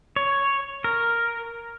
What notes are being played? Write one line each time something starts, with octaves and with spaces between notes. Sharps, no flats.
C#5
A#4